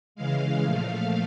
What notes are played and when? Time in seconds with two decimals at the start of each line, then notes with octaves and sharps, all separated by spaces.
0.15 C#3 E3 G#3 F5
0.62 A#2 F3 A3